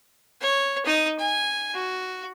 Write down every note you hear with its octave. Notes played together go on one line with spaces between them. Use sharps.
C#5
D#4 D#6
G#5
F#4